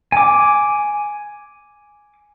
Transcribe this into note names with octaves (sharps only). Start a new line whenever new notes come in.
G#5 D6